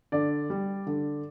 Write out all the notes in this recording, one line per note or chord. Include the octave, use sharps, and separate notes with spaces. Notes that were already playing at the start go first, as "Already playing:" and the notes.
D3 D5
G3
D3